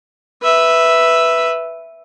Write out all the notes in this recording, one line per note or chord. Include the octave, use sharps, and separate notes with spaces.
B4 E5